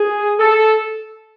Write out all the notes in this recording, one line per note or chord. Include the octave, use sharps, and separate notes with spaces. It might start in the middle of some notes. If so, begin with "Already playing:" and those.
Already playing: G#4
A4